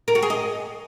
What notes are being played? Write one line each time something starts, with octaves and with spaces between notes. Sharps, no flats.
A#4
F#4
G#4
D#5